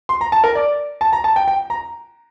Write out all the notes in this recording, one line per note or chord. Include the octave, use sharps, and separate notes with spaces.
C6
A#5
A5
A#4
D5
A5
A#5
A5
G5
G5
A#5